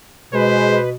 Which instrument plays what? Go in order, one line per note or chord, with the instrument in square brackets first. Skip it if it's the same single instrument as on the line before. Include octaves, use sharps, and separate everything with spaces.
[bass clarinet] B2 [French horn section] G#3 [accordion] B4 [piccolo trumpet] C5